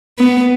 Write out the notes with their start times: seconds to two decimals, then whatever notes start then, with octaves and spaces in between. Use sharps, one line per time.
0.19 B3